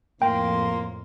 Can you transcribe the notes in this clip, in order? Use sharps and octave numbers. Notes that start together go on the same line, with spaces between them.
F2 A2 A#3 G5 C6